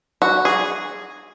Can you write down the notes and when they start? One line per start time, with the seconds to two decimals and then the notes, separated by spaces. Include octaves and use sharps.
0.22 F#4
0.45 G#4